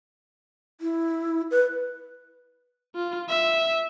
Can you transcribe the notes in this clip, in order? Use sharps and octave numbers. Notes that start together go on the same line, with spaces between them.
E4
B4
F4
E5